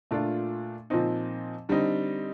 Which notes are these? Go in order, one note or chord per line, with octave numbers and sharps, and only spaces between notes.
A#2 A3 D4 F4
A#2 F3 C4 D#4
D3 G3 C4 D#4